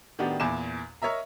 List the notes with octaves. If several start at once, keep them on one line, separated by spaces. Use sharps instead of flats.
A2 D#3 B3 D4 F#4 G4
E2 A#2 G#5 B5 D6 E7
A#4 C#5 D#5 E5 A#5